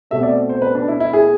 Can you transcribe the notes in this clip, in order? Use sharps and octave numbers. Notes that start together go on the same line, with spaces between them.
B2 A3 C4 E5
D5
C5
B4
D4
E4
E4
G#4